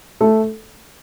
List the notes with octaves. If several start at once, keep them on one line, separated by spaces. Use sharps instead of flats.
A3 A4